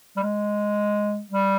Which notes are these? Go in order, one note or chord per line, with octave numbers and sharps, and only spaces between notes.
G3
G#3
G3